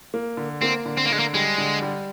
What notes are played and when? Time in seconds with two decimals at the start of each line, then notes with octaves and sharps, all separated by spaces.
0.14 A#3
0.37 D3
0.62 A#3 C4
0.86 D3
0.97 C4
1.06 A#3
1.10 D3 G#3
1.19 A#3
1.34 G3 G#3
1.58 D3
1.82 G3